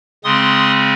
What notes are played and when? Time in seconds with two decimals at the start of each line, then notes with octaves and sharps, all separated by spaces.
0.24 C#3 G#3 C4 C6 D#6